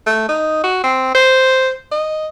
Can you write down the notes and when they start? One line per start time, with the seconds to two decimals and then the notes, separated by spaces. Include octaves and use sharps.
0.06 A3
0.29 D#4
0.64 F#4
0.84 C4
1.15 C5
1.91 D#5